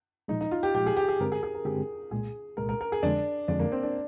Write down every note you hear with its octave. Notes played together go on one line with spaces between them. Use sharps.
A#2 F3 G#3 D#4
D#4
F4
G4
A#2 F3 G#3 G4
G#4
G4
G#4
G2 D3 G#3 C4 G4 A#4
G#4
G#4
A#4
G2 D3 G#3 C4 G4 G#4
C2 A#2 G#3 G#4
C2 A#2 G#3 A#4
A#4
A#4
G#4
F2 D3 G#3 D4
F2 D3 G#3 D4
A#3
C4
D4